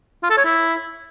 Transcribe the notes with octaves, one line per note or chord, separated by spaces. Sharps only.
F4
A4
C#5
E4